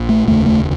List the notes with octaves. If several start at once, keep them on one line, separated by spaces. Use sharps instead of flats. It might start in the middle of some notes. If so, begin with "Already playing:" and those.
Already playing: A#1 A#2
A3
F1 D#2 C#3 A3
A3